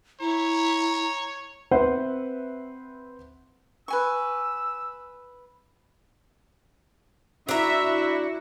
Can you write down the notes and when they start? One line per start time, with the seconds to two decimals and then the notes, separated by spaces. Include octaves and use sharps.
0.21 E4 C#5 A#5
1.71 C4 B4 C5 E5 F#5
3.88 B4 G#5 C#6 E6
7.49 D4 E4 F#4 E5 A#5